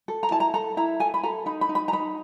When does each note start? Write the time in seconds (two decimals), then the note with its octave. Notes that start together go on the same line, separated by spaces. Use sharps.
0.08 A4
0.23 A#5
0.31 E4 A5
0.40 A#5
0.54 A4 A#5
0.77 E4 A#5
1.00 A4 G#5
1.14 B5
1.23 A4 A#5
1.46 D#4 B5
1.61 B5
1.69 D#4
1.75 B5
1.88 A#5
1.93 D#4 B5